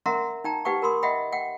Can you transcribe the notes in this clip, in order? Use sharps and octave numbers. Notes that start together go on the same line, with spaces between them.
C#4 A#4 E5 F#5 A#5 C6
D#4 G5 A#5
D#4 G4 B4 F#5 G5 C#6
A#4 B5 C6 D#6
D#5 E5 F#5 G5 B5
F#5 G5